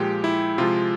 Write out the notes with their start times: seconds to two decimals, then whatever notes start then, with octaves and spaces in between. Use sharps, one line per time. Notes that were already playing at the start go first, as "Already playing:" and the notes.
Already playing: A#2 F3 G#3 G4
0.24 E4
0.58 C3 F3 G#3 F4